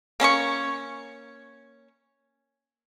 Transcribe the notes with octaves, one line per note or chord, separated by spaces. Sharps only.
A#3 C#4 E5 C#6